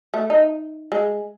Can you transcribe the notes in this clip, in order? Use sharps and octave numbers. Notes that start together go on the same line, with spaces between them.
A3
D#4
G#3